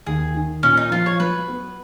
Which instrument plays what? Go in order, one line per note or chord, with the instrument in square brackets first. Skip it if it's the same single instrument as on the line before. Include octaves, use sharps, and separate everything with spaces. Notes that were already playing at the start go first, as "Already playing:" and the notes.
[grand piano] D#2 [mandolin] G#4
[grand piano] D#3
[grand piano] A#2 [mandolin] C#4
[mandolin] D#4
[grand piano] F3 [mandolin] F4
[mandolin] C#5
[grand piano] F#3 [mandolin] B4
[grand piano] B3